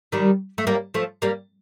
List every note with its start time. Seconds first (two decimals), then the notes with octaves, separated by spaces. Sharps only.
0.12 D#3 G3
0.58 A3
0.67 G3 A#3
0.94 F3 A3
1.22 G3 A#3